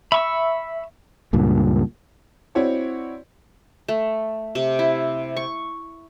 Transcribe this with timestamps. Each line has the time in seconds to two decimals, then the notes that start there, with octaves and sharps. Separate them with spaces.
0.12 E5 B5 C#6 E6
1.33 C#2 G2 A#2
2.55 C4 E4 F#4 C#5 D5
3.88 A3
4.55 C3
4.79 E4
5.37 C#6